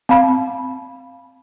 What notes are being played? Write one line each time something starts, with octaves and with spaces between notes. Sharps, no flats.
C4 F5 B5